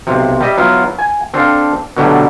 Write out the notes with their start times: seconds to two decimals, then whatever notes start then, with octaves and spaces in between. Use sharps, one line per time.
0.07 B1 C3
0.40 G3 D#5 E5
0.57 F#3 B3 E4 F4
0.98 G#5
1.34 C4 D4 A4 F5
1.96 B2 D3 F#3 G3 A3